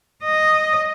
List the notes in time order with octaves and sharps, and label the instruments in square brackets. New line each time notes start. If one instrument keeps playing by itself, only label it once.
[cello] D#5